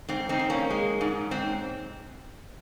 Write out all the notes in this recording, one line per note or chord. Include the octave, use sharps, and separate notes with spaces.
G#2 C4
C4 D#4
G#2
A#3 C#4
G#3
G#2
G#2 C4